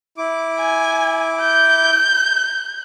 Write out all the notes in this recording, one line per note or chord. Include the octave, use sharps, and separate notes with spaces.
E4 D6
G#5
G6